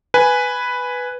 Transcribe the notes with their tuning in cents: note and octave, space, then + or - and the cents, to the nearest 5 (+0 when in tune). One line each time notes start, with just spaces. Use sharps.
B4 +0 G#5 +0